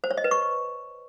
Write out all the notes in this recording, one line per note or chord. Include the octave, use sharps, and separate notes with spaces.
C5
C#5
D#5
B4
C#6